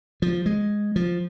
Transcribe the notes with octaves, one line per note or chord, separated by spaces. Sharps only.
F3
G#3
F3